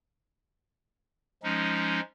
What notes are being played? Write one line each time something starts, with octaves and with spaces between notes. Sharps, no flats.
F3 G#3 C#4 D#4